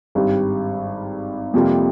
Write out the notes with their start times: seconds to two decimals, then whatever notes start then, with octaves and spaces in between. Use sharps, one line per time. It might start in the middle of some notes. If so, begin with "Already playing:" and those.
0.15 G#1 G2 G3
1.54 F2 C3 G3 A#3 F4